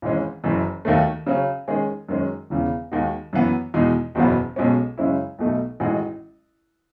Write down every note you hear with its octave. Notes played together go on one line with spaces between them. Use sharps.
G#1 G#2 E3 G#3 C#4
F#1 F#2 E3
D#2 D#3 F#3 A3
C#3 F#3 C#4
D#3 G#3 C#4 G#4
F#2 D#3 G#3 C#4
E1 E2 C#3
D#2 D#3 G#3 D#4 F#4
F#2 E3 B3
E2 B2 G#3 D#4
F#1 E2 B2 F#3 B3
B1 B2 G#3 C#4
F#2 C#3 G#3 C#4 E4
B1 B2 A3 D#4
A1 A2 G#3 D#4 F#4